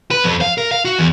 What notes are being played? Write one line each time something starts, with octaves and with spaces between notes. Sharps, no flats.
B4
F2
F5
A#4
F5
F#4
E2